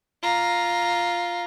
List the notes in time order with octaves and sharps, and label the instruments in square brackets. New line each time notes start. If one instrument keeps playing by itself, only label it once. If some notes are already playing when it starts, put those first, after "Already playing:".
[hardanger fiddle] F4 A#5